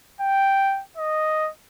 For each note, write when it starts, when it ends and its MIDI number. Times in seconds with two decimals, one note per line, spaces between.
0.21 0.82 79
0.97 1.50 75